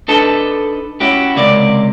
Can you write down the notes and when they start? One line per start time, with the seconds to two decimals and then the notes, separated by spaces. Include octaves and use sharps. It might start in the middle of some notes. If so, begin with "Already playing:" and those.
0.08 D4 D#4 A4 B4 A5
1.00 C#4 E4 F#4 G4
1.36 C#2 C3 A#3 D5